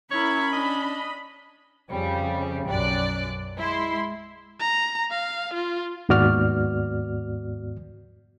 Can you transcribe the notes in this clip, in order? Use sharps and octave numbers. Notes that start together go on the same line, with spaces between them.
C#4 E4 A#4 C#5 B5
D4 D#5
F2 C#3 G3
B1 F#2 D5 F#6
G#3 E4 C6
A#5
F5
F4
D#2 G#2 B3 F#4 D5 F6